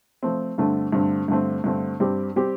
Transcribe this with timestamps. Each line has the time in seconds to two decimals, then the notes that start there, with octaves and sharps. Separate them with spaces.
0.23 F3 A3 C4
0.58 G2 D3 A3 C4
0.92 G2 D3 A3 C4
1.28 G2 D3 A3 C4
1.64 G2 D3 A3 C4
2.00 G2 G3 C4 G4
2.36 G3 C4 G4